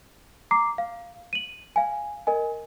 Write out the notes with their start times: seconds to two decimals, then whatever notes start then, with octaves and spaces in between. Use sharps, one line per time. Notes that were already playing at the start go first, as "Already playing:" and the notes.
0.51 A#5 D6 C7
0.78 F5
1.33 D#7 F#7
1.76 F5 G#5
2.27 A#4 D#5 G#5